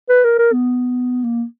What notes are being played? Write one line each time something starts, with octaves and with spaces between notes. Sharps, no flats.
B4
A#4
A#4
B3
A#3